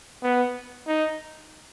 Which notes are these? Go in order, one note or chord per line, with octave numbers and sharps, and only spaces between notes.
B3
D#4